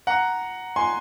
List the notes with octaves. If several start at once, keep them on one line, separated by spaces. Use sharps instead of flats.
F#5 A#5
G#5 C6